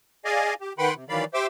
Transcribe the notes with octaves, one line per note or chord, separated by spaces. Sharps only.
G#4 D5 D#5 F5 G#5
G4
D#3 B4 F#5 G5 B5 C6
C3
D#3 E3 F#3 D5 F5 B5
G4 C5 E5 C6 D6 E6